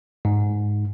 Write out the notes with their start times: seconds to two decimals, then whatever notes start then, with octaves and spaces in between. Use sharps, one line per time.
0.25 G#2